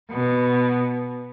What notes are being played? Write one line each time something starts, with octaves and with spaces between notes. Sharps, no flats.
B2